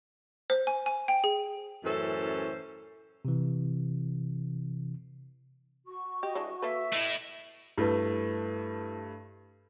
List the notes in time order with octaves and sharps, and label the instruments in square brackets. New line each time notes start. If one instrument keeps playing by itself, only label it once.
[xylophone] C5
G#5
G#5
G5
G#4
[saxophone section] F#2 A2 E3 C#4 A4 C5
[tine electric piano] C3 E3
[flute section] F#4 C#6
[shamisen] G4 [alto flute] D#5
[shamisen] E3 G#3 D4
[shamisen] A#3 A4 B4 [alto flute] E5
[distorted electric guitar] A3 E4 [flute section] D#5
[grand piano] G2 A3 [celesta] E4 B4